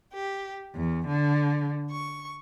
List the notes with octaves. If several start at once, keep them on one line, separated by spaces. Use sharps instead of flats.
G4
E2
D3
C#6